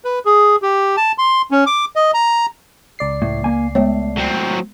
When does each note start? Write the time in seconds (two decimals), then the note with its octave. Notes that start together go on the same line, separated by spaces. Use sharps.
0.05 B4
0.25 G#4
0.62 G4
0.97 A5
1.18 C6
1.51 C#4
1.66 D6
1.96 D#5
2.14 A#5
2.99 C#2 D5 C7
3.22 A2
3.44 A#3 G#5
3.75 G#3 A3 B3 C#5
4.17 F#3 C4